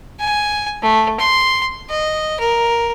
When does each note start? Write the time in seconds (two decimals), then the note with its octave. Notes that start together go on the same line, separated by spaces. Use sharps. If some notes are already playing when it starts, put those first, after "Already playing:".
0.20 G#5
0.82 A3
1.19 C6
1.90 D#5
2.40 A#4